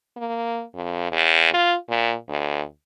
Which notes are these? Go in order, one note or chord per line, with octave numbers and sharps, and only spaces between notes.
A#3
F2
E2
F4
A#2
D2